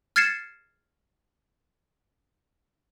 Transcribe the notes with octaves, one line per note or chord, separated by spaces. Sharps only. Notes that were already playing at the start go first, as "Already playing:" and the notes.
F6 G#6 A6 C7 C#7 E7